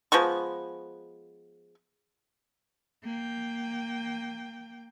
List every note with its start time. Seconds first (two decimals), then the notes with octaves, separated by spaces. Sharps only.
0.12 F3 G#3 B3 C#6
3.04 A#3 G5